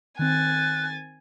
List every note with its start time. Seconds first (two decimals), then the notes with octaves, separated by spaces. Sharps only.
0.19 D#3 C4 G#5 F#6 A6